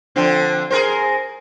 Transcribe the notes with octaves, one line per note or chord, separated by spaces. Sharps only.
D3 F3 C4
G#4 A#4 C5